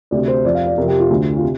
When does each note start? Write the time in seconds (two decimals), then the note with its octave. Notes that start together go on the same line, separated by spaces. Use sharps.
0.11 D2 C3 D5
0.28 C5
0.45 F2 C3 D5
0.55 F5
0.66 D5
0.78 C3 A#4
0.81 F2
0.88 G4
1.00 F4
1.10 D2 D3
1.37 F4
1.42 C3